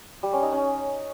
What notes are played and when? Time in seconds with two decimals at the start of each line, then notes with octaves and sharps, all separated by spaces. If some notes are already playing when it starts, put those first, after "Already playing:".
0.23 G3
0.33 C#4
0.43 D#4
0.52 C#4